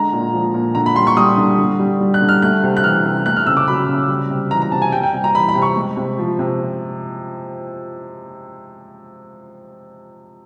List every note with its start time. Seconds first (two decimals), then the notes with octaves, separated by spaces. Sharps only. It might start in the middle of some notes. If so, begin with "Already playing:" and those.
Already playing: D3 G#3 A#5
0.13 A#2
0.33 F3
0.54 A#2
0.75 D3 A#5
0.86 B5
0.96 G3 C6
1.07 C#6
1.17 G3 D#6
1.38 D3
1.59 D3
1.80 G3
2.00 G3
2.14 F#6
2.22 D3
2.29 F6
2.42 A3 F#6
2.63 C3
2.77 F#6
2.84 E3 F6
3.05 C3
3.26 A3 F#6
3.36 F6
3.46 C#3 E6
3.57 D6
3.68 F#3 B5
3.88 C#3
4.09 G3
4.30 C3
4.51 E3 A#5
4.62 A#5
4.72 C3 A5
4.82 G#5
4.92 G3 G5
5.03 G5
5.14 C3
5.24 A#5
5.34 E3 B5
5.48 B5
5.55 C3
5.62 C#6
5.76 G#3
5.97 C3
6.18 F3
6.39 C3